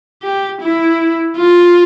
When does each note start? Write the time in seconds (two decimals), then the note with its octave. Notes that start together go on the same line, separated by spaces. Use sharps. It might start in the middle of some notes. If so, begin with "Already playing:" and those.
0.23 G4
0.61 E4
1.37 F4